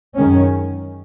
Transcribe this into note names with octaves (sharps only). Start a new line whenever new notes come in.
F#2 D#3 G#3 C#4